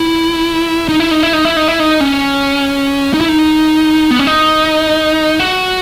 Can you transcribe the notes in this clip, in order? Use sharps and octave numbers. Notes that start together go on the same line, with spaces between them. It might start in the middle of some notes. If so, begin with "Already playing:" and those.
Already playing: E4
D#4
E4
D#4
E4
D#4
E4
D#4
E4
D#4
C#4
D#4
E4
D#4
B3
C#4
D#4
F#4